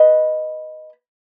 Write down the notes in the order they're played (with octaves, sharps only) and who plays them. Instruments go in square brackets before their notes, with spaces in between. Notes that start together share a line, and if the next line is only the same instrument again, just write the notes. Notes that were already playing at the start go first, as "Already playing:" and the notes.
Already playing: [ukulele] B4 D#5